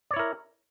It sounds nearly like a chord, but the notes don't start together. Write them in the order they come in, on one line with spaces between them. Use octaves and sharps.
D5 C#5 E4 A#4